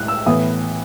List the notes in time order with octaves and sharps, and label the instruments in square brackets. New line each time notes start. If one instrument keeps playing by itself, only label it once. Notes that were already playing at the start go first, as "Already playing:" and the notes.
Already playing: [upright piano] A2 G#3 F#6
E6
A2 E3 B3 D#6